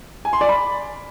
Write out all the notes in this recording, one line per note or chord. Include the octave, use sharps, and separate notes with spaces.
G#5
C6
D5
B5